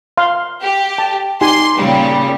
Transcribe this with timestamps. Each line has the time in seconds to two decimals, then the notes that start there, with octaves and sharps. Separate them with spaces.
0.17 F5 C6
0.61 G4
0.98 A5
1.41 D#4 G4 G#5 C6
1.78 A#2 C#3 G3